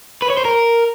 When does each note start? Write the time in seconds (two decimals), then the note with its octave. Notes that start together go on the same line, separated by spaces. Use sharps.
0.22 B4
0.30 C#5
0.37 C5
0.45 A#4